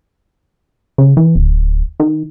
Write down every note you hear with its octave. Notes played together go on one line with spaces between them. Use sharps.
C#3
E3
D1
D#3